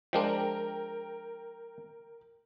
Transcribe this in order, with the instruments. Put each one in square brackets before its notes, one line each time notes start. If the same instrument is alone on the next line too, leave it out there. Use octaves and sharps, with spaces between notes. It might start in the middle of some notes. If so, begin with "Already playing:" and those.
[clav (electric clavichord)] F3 G#3 D4 [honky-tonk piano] A#4 G5